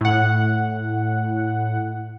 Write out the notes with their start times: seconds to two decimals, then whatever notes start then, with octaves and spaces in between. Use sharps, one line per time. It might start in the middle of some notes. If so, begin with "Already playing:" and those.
0.01 A2 F#5